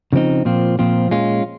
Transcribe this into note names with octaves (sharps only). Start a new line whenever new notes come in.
C#3 F3 C4 D#4
A#2 F3 C4 F4
A#2 F3 C4 F4
A#2 G#3 C#4 F4